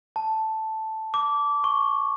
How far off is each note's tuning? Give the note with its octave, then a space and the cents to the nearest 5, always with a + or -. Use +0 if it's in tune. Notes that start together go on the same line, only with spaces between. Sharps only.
A5 +0
D6 -20
C#6 -10